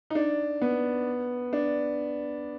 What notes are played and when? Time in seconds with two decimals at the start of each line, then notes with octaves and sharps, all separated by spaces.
0.10 D#4
0.15 D4
0.61 B3
1.53 D4